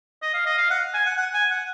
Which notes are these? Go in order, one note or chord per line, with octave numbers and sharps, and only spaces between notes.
D#5
F5
D#5
F5
F#5
G#5
F#5
F#5
G#5
F#5